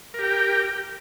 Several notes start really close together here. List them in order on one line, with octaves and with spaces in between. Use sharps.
A#4 G4 G5